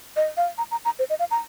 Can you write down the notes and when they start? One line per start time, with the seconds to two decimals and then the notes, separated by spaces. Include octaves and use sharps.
0.16 D#5
0.37 F5
0.58 A#5
0.71 A#5
0.85 A#5
0.99 C5
1.10 D#5
1.19 F5
1.31 A#5